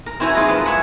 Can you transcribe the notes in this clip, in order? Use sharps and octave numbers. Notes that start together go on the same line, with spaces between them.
A#4
C4 E4 F#4 C#5 G#5 A#5
D#4 F4 G#4 A#4 B4 D#5
G#3 B4 A5
C#5 E5 F#5